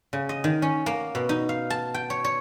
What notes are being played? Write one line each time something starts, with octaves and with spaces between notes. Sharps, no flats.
C#3
D#5
D#3
C#4
A#3
B2
D#4
F5
A5
G5
C#5
C#5